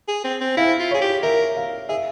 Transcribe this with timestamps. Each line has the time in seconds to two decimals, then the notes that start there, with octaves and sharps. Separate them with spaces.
0.08 G#4
0.24 C4
0.41 C4
0.57 E4 F5
0.79 F4
0.91 G#4 C#5
1.02 G4
1.23 A#4 E5
1.57 F5
1.89 G#4 E5